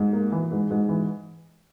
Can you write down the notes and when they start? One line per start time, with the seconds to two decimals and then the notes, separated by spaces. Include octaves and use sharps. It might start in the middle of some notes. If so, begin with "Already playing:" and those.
Already playing: G#2
0.13 A#3
0.32 E3
0.51 G#2
0.70 G#2
0.88 E3